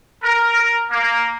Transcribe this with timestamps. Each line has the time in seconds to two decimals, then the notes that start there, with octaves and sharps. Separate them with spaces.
0.22 A#4
0.91 A#3